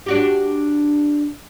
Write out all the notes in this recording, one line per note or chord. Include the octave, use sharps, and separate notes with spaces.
D4 F#4 G4